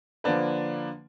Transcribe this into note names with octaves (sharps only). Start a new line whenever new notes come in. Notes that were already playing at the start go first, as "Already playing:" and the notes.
D3 F3 A#3 D4 B4